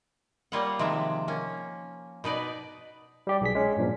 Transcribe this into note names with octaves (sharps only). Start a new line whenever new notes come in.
G3 A#3 F4 C#5 D#5 F#5
C3 D#3 F3 G#3 E5
A#3 C#4
B2 D#4 B4 D5
G3 G4 D5
B1 G#4 B6
G#3 C#4
G2 A#2 F3